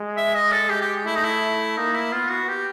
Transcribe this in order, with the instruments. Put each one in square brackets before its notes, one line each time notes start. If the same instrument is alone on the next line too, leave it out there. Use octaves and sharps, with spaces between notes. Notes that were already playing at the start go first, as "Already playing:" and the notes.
Already playing: [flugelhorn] G#3
[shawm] E5
D#5
A4
[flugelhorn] G#3 [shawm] G4
[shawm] G4
[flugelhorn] A3 [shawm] E4
[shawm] D#4
E4
[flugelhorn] A#3 [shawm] D#4
[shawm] E4
[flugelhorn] B3 [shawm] F4
[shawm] F#4
G4